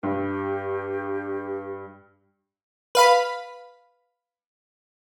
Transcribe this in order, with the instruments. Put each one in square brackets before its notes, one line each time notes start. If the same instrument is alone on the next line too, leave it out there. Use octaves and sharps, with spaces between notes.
[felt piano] G2 [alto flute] G4
[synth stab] B4 F5 B5